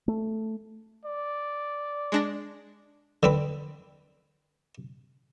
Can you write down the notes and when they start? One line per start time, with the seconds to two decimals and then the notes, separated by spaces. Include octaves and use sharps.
0.08 A3
1.05 D5
2.12 G#3 D4 A#6
3.23 D3 C4 B4